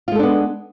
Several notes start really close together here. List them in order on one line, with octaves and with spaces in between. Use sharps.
F4 G#3 A4 D4 B3